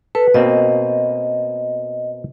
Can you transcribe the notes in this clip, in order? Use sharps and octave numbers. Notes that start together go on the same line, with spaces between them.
A4 B4
B2 A#3 C4 D#5